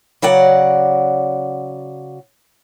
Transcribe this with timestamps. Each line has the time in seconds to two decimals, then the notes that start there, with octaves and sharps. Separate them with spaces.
0.22 C#3 F#3 D5 F#5